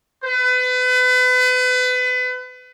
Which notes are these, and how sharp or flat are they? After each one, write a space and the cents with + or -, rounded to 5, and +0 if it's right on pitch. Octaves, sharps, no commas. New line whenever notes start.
B4 +30